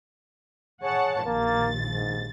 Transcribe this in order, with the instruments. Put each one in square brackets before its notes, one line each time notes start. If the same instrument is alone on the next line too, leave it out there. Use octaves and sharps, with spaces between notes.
[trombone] G#4 [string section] C#5 F#5 A5
[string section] A#1 D#2 A6 [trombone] A#3
[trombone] G#2